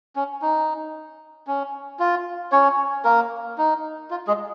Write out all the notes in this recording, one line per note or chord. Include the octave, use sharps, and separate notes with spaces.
C#4
D#4
C#4
F4
C#4 C#5
A#3 A#4
D#4
F4
G#3 G#4